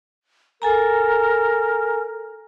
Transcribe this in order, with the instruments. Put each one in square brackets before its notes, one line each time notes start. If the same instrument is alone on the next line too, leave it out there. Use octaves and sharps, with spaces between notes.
[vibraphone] A4 G#5 A#5 [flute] A#4